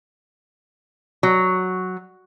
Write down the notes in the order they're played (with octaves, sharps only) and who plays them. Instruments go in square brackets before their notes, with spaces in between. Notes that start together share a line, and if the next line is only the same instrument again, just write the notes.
[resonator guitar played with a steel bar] F#3